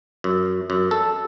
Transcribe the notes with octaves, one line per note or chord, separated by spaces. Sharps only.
F#2
F#2
A4